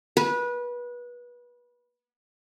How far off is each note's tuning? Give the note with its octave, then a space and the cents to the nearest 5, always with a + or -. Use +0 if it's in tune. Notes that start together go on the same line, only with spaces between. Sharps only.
B4 -25